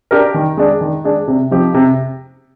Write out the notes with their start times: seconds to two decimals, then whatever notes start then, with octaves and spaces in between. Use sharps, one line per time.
0.11 D4 G4 A#4
0.34 D#3
0.57 G#3 D4 G#4
0.81 D#3
1.04 G#3 D4 G#4
1.28 C3
1.51 F3 C4 D#4 G4
1.74 C3